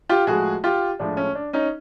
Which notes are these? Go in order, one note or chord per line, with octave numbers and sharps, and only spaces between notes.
F4 G4
A2 F3 G#3 F#4 G#4
F4 G4
A2 F3 G#3 D4
C#4
D4
C#4 D#4